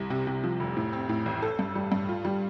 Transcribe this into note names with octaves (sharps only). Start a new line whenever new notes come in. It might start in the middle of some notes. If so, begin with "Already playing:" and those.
Already playing: C2
C3
C3
F3
F1
A2
C4
A2
A1
A4
G2
G3
G2
F4
G3